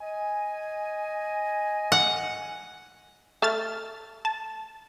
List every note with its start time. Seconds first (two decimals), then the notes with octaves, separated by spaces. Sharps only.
0.01 D#5 G#5
1.92 F#5
3.42 A3 A5 F6 A6
4.25 A5